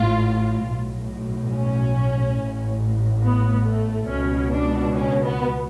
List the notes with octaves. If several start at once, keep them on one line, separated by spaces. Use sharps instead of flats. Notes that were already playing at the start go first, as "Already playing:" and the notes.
Already playing: A1 A2 F4
B1 A2
C#4
A1 A2
B3
A3
C#2 B2 C#4
D4
C#4
B3